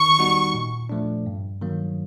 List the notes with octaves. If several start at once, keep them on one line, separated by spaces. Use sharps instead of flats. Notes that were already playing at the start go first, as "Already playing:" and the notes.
Already playing: D#3 C#6
G3 B3 D#4 F#4
A#2
F3 A3 D4
G2
D#3 F#3 A#3